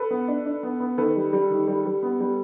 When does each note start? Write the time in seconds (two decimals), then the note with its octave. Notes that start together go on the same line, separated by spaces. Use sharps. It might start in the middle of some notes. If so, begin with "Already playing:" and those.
Already playing: A4 B4
0.11 B3
0.28 D4
0.46 D4
0.63 B3
0.80 B3
0.97 D#3 A4 B4
1.16 G3
1.33 G3
1.50 D#3
1.67 G3
1.86 G3
2.03 B3
2.20 G3